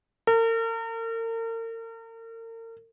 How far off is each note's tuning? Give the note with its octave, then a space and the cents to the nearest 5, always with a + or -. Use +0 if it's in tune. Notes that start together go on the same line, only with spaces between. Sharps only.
A#4 -40